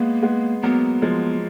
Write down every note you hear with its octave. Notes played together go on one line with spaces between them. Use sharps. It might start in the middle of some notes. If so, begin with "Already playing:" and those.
Already playing: G#3 A#3 B3
G#3 B3
F#3 A#3 B3
F3 G#3